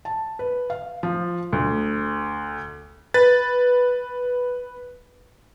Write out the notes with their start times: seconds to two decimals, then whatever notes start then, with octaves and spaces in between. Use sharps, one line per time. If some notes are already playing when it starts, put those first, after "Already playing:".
0.05 A5
0.39 B4
0.70 F5
1.03 F3
1.52 D2
3.14 B4 A6